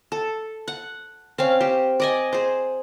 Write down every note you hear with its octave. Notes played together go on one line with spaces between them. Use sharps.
A4
F#5
C4 C#4 F5
G4 C5
D5 D#5 G#5
G#4 C5